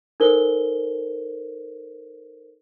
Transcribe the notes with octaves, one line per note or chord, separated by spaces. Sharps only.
D#4 A4 A#4 C5 G7